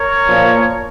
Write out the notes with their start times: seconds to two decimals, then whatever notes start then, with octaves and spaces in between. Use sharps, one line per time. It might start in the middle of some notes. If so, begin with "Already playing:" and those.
Already playing: A#4 C#5
0.28 A#2 F3